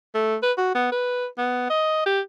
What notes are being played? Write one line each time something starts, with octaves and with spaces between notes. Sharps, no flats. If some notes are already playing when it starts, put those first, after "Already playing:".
A3
B4
F#4
B3
B4
B3
D#5
G4